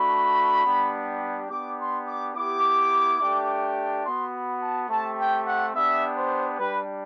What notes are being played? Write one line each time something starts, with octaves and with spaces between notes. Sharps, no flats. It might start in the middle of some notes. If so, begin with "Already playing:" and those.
Already playing: A3 D4 F#4 B5
G3 B3 D4 G4
B3 D4 G4 D6
C6
D6
B3 E4 G4 D6
A3 D4 G4
B3 F#4 C6
B5
A5
A3 C4 G4 A5
G5
F#5
B3 D4 G4 E5
C5
G3 D4 G4 B4